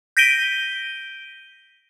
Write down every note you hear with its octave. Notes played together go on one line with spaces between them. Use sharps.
G6 A#6 B6 D7 D#7 G7